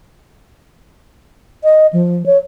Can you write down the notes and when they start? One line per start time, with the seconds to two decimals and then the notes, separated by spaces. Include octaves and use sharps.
1.64 D#5
1.93 F3
2.26 C#5